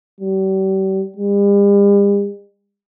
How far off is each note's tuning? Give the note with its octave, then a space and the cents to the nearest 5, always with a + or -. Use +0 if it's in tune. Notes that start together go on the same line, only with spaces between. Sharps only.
G3 -40
G3 +45